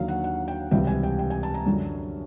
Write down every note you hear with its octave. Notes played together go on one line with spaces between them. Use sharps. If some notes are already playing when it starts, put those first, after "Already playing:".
Already playing: D#2 D3 F#3 F5
F#5
F#5
G5
C#2 C3 E3 G3 G5
G#5
G5
G5
G#5
A5
A#5
F#2 D3 F#3